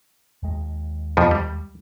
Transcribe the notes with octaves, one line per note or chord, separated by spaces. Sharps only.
D#2 G#3
F2 B2 F3
G3